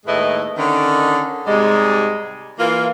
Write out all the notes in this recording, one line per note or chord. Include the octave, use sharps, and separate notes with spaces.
D#2 A2 G#3 E4 B4 D#5
D3 D#3 C#4
G#2 C3 G3 G#3
E3 A#3 F4